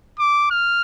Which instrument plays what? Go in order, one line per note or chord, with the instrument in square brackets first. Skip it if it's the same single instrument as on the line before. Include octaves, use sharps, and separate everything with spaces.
[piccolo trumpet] D6
F6